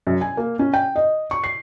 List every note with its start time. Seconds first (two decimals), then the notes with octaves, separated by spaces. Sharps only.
0.07 F#2
0.21 G#5
0.37 A#3
0.59 C#4
0.74 G5
0.96 D#5
1.31 C#6
1.44 C7